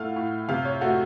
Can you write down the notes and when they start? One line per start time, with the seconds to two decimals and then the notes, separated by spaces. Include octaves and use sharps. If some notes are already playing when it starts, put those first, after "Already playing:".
Already playing: A2 A3 F5 F#5
0.16 A2
0.49 C3 F5
0.65 C#5
0.81 A3 F#4